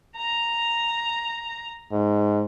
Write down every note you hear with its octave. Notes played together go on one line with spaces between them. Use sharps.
A#5
G#2